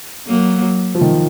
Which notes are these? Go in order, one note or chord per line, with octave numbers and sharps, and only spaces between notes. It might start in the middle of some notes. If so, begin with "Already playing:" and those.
F#3 A#3
F3
D#3